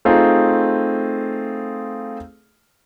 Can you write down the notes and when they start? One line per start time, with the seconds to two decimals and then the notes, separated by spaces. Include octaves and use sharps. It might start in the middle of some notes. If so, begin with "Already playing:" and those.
0.05 A3 C4 D#4 F4 G#4